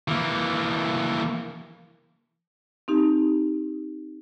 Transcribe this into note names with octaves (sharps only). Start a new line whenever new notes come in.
E3 A#3
C4 D#4 G4